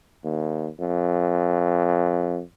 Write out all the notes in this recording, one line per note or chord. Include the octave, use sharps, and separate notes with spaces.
D#2
F2